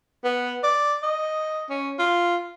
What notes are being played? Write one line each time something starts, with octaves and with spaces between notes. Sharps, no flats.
B3
D5
D#5
C#4
F4